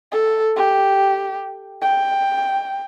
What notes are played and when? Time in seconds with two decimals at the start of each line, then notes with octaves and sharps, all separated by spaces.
0.12 A4
0.56 G4
1.82 G5